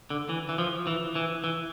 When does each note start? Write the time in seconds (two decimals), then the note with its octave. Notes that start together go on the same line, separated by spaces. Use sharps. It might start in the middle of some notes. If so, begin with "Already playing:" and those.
0.10 D3
0.29 E3
0.49 E3
0.58 F3
0.87 E3
1.15 E3
1.44 E3